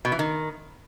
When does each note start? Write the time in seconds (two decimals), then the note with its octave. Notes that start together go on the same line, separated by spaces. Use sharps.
0.05 B2
0.12 E3
0.19 D#3